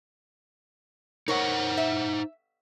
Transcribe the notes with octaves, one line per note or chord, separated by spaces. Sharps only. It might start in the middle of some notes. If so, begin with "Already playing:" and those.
D#4 A#4 C5 C#5 F#5
E5